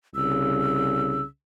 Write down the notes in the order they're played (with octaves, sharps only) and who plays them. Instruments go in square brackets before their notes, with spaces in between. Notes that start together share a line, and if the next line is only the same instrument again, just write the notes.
[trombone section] C2 C#3 [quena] E6